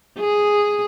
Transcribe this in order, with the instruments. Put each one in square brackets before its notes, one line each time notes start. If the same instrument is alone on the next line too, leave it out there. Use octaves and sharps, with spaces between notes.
[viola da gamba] G#4